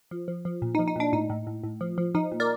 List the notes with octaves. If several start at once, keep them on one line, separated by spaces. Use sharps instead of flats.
F3
F3
F3
A#2
D#4
F3
D#4
A#2 D4
A2 D#4
A2
A2
A2
F3
F3
F3 D#4
A#2
A#4 D5